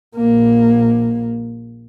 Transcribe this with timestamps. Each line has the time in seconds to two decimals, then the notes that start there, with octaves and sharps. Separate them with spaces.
0.16 A#1 A#3